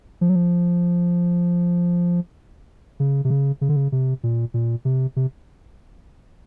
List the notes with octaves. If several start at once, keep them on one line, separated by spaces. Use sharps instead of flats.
F3
F#3
F3
C#3
C3
C#3
C#3
D3
C#3
C3
A#2
A#2
C3
C3